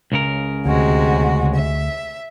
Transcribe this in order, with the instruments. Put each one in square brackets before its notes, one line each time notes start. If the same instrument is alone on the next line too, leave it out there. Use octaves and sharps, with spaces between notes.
[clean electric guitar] C#2 C#3 A#4
[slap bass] D2 [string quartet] C3 G#3 F#4
[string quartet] E5